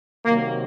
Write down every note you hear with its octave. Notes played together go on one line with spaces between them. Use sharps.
C3 D#3 F#3 A#3